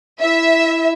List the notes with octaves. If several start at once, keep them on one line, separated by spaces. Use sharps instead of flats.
E4 E5